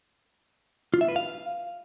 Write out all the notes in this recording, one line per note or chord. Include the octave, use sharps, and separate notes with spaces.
F4
E5
B4
F5